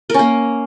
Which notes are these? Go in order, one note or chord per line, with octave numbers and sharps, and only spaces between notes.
A#3 C#4 A#4